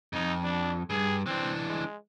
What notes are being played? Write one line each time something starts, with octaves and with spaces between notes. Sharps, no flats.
F2 D#4
D4
G2 G#4
E3 C4 D4
G#3